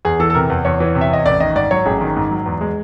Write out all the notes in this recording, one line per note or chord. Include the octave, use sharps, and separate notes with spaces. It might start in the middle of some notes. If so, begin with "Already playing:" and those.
E2 G#4
E3 A4
A4
C3 A#4
E2
E2 C#5
E3
C3
E5
E2 D#5
A1 D5
D#3 D#5
G#2 D5
F#3 C#5
A1 G#4
D#3
G#2
F#3
E2
G#3